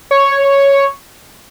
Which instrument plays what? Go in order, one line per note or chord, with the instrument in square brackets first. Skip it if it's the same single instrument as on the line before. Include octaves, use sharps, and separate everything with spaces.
[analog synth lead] C#5